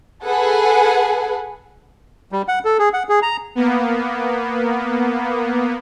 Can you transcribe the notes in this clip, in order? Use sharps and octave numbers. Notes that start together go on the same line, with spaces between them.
G#4 A4 B4 F#5 G#5
G3
F#5
A4
G#4
F#5
G#4
A#5
A#3 B3